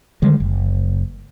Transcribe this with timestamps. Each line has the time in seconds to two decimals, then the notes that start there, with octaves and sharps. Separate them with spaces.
0.22 D3 D#3 G3 G#3
0.40 F#1